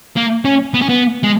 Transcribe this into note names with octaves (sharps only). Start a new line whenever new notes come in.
A#3
C#4
B3
C#4
B3
G#3